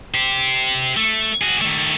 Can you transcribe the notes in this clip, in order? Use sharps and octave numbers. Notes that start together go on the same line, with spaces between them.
G4 C5
A3
F#4 G#4
D#3 A3